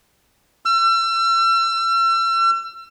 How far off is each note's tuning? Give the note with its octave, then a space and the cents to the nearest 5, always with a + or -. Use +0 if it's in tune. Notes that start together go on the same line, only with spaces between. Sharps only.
E6 +40